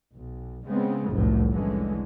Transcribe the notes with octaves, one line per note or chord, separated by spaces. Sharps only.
B1
C#3 G#3 B3 C4
F1 C2 F#2 A2
C2 D3 E3 G#3 C#4